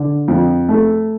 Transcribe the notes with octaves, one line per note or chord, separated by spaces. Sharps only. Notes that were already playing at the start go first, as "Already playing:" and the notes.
Already playing: D3
F2
A3